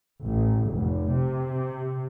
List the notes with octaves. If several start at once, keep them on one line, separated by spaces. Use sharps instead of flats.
A1
F1
C3